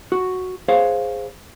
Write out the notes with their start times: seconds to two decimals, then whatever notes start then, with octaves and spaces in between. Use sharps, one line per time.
0.12 F#4
0.68 G#4 C5 C#5 F5